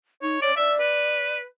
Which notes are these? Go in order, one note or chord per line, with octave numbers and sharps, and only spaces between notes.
D#4 C#5
C#5 D5
D5 E5
B4